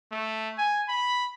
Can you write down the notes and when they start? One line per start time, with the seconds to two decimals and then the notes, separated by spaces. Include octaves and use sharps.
0.11 A3
0.58 G#5
0.88 B5